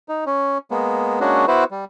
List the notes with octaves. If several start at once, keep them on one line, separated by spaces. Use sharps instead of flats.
D#4
C#4
G#3 A#3 B3
G#3 A#3 C#4 D4 F#4
B3 E4 F#4 B4 C5
G3